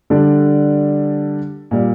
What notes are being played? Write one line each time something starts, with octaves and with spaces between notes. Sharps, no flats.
D3 G3 D4 A4 D5
A#2 G3